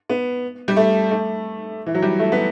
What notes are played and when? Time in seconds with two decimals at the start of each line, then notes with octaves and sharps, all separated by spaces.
0.09 B3
0.68 G3
0.76 A3
1.11 A3
1.86 E3
1.95 F#3
2.02 G3
2.19 A3
2.32 B3